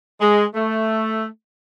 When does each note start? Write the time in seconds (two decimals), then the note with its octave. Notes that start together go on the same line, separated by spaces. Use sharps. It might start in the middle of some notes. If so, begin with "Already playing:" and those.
0.21 G#3
0.55 A3